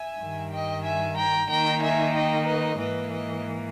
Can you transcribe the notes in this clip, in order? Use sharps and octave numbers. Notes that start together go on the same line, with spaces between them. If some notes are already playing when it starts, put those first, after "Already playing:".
Already playing: E5 G#5
G2 D#3 G3
D#5 G5
E5 G#5
G5 A#5
D#3 A#3 D#4 G5 A#5
E5 G#5
D#5 G5
B4 D#5
G#2 E3 A#3 B4 D#5
B4 D#5